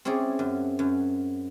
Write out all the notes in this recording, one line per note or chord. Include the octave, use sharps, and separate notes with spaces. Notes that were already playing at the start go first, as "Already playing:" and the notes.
C4 C#4 E4 G#4 D5
F#2
F#2